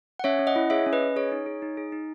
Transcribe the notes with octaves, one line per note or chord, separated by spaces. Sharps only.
F#5
C#4 C#5 E5
C#4
D#5 F#5
E4
G#4 C#5 E5
C#4
B4 D#5
C#4
G#4 C#5
D#4
G#4
D#4
G#4
D#4